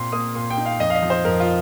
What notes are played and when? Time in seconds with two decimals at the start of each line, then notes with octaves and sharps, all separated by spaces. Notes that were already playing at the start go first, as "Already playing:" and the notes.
Already playing: A#2 C4 C6
0.12 A#3 D#6
0.35 A#2 C6
0.50 G5
0.58 D#4
0.65 F5
0.80 F2 D#5
0.90 F5
0.95 D#5
1.03 F3
1.10 C5
1.25 F2 A#4
1.40 F4